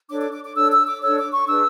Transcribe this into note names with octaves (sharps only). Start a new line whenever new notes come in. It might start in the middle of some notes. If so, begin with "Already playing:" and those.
D4 A4 C#5 D6
D6
D6
D6
D4 A4 C#5 E6
E6
D6
D4 A4 C#5 E6
D6
C#6
D4 G#4 B4 E6